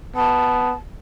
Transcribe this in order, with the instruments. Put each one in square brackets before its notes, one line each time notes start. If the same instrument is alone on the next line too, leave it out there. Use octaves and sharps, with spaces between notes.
[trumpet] B3 [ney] A5